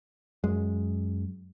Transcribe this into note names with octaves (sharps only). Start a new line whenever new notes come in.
F#2 G#3